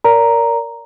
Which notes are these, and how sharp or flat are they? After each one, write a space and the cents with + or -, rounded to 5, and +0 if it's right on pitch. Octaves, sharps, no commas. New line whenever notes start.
A#4 +0 D5 -35 A#5 +0